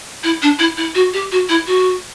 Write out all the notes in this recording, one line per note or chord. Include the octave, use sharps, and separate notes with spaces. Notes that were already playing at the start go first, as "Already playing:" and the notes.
E4
D4
E4
E4
F#4
G4
F#4
E4
F#4